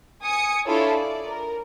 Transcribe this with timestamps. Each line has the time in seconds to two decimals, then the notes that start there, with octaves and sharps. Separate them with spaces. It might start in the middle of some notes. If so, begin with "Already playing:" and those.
0.22 G#5 D#6 C#7
0.66 D4 E4 F4 A4 C#5
0.96 D5
1.28 A#4